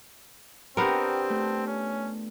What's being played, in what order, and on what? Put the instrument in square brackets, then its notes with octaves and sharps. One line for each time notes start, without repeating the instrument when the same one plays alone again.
[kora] B3 A#4 [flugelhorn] C4 [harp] D4 F4 G4
[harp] A3
[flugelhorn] C#4